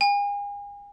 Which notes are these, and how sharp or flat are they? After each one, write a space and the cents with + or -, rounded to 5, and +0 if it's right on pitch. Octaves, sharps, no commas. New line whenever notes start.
G#5 -40